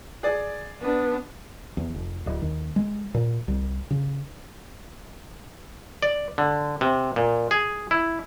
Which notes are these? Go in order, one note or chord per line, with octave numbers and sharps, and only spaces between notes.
G#4 D5
B3 D4
E2
F1
D1
D#2
G#3
A#2
C2
C#3
D5
D3
C3
A#2
G#4
E4